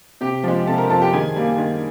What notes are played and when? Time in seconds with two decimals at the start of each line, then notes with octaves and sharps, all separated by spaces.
0.21 C3 G4 G5
0.44 F3 G#3
0.67 C3 A4 A5
0.78 A#4 A#5
0.89 F3 G#3 A4 A5
1.02 G4 G5
1.13 D#3 G#4 G#5
1.36 G3 A#3
1.58 D#3